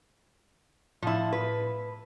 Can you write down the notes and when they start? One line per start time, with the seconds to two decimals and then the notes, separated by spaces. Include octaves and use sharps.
1.03 A2 F3 E4 A5
1.33 B4